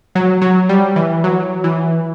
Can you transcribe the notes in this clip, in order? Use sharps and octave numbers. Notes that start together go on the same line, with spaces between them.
F#3
F#3
G3
E3
F#3
E3